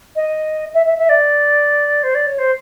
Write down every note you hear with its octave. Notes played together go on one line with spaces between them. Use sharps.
D#5
E5
E5
E5
D5
C5
D5
C#5
C5